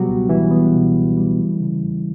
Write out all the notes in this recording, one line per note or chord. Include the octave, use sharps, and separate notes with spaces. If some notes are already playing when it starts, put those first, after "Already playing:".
Already playing: B2 F#3 G3 B3 F#4 G4
C#2
E3 G3 E4
B3
B2
C#2
G3
A3
C#3
E2